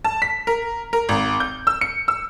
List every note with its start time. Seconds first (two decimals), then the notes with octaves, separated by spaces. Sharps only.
0.05 A5
0.22 B6
0.47 A#4
0.93 A#4
1.09 G#1
1.40 G6
1.67 E6
1.81 C#7
2.08 E6